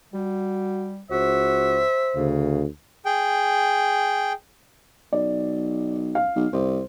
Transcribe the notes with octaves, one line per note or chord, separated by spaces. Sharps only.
G3 F#4
C#2 F#4 C5 E5
D2 C#3
G#4 G5
B1 D5
F5
B1
C2 C5